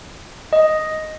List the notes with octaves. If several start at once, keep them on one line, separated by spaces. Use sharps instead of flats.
D#5